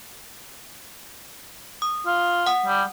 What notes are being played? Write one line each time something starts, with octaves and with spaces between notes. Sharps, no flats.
D#6
F4
F#5 D#6
G3